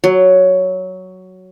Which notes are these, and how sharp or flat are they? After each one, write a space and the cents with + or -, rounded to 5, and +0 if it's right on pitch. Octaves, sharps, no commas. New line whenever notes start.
F#3 +5